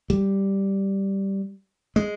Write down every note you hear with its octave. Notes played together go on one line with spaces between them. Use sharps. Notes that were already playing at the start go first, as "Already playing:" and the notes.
G3
G#3